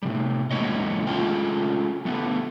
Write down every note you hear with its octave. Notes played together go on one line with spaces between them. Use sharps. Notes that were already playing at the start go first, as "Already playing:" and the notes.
A2 C3 G3
E2 G#3 A#3 E4 C#5 D#5
G#3 A3 C#4 F4 G5
G3 A3 B3